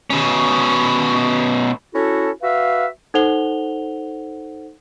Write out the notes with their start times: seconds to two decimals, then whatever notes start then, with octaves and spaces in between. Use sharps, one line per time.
0.10 B2 C#4
1.94 C#4 E4 F#4 A4
2.43 F#4 B4 E5 F5
3.14 D#4 A4 C5 F#5 F7 G7